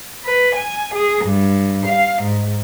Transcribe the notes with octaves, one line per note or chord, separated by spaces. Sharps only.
B4
G#5
G#4
G2
F5
G#2